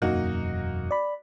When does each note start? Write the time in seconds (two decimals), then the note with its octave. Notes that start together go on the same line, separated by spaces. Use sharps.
0.02 E1 F#2 A#3 D#4 F#4
0.91 D5 B5